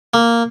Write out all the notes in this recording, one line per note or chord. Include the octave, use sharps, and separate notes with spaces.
A#3